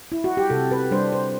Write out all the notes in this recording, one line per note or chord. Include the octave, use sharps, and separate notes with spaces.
E4
F#4
G4
C3 A4
B4
G3 D4 C5
C5